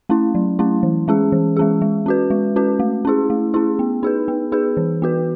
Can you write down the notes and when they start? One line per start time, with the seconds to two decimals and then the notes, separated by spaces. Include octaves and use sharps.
0.09 A3 C#4 E4
0.35 F#3
0.59 A3 C#4 E4
0.83 E3
1.08 G#3 C#4 G#4
1.32 E3
1.57 G#3 C#4 G#4
1.82 G#3
2.06 C#4 F#4 B4
2.30 G#3
2.56 C#4 F#4 B4
2.79 A3
3.05 C#4 E4 G#4
3.30 A3
3.54 C#4 E4 G#4
3.79 B3
4.03 D#4 G#4 B4
4.28 B3
4.52 D#4 G#4 B4
4.77 E3
5.02 B3 F#4 B4